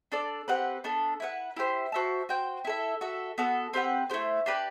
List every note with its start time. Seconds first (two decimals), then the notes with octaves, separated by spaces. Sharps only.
0.12 D4 A4 D5
0.48 C4 G4 B4 F#5
0.84 B3 D4 A4
1.20 E4 B4 F#5
1.56 E4 G4 C5
1.92 F#4 C5 E5 A5
2.29 F#4 C5 G5
2.65 E4 A4 E5
3.01 F#4 A4 E5
3.38 B3 F#4 A4
3.73 C4 G4 B4 F#5
4.10 A3 E4 G4 C5
4.46 D4 G4 B4 D5